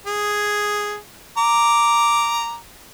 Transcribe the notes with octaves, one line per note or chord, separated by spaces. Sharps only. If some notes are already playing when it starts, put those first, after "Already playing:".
G#4
A#5 D6